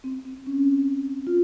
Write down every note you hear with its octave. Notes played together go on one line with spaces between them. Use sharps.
C4
C4
C#4
F4